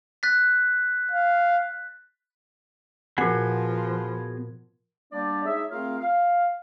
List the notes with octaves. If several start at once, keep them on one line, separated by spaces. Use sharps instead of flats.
F#6 A6 B6
F5
A#2 F3 B3 F#4 G#4 F#5
G3 A#3 B3 D4 G4 D5
G#3 D#4 G#4 C#5 E5
A3 C4 F4 G#4 A#4 F5
F5